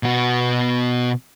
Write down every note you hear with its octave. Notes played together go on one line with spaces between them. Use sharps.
B2 F#4